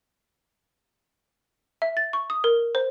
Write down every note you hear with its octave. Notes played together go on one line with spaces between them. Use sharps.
E5
A6
C#6
D#6
A#4
C5